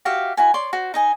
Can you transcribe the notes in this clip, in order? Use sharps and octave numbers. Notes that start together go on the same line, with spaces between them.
F#4 G4 E5 F5
E4 F#4 G#5
C#5 D5 C6
F#4 C5
D#4 D#5 G#5